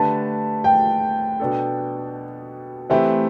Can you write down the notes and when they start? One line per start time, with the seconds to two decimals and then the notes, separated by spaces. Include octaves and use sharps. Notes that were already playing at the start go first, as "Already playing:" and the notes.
Already playing: D3 A3 D4 G4 B4 A5
0.64 G5
1.40 B2 B3 D4 A4
2.90 E3 A3 C4 G4 B4 E5